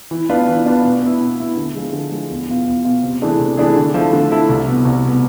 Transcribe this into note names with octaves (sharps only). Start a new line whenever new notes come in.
E3
B3 D4 F4 B4
E3
B3 D4 F4 B4
B2
B3 E4
B2
B3 E4
D3
F3 G#3
D3
F3 G#3
E2
B2 B3 F4
E2
B2 B3 F4
C3
E3 A3 D4 G#4
C3
E3 A3 D4 G#4
D3
F3 A3 E4 A4
D3
F3 A3 E4 A4
C2
B2 B3
C2
B2 B3